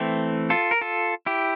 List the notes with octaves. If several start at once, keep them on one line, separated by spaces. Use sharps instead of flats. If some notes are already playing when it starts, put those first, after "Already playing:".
Already playing: E3 A3 C4
F4 A4
A#4
F4 A4
E4 G4